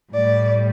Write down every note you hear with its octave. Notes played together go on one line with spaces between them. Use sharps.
A2 G3 D5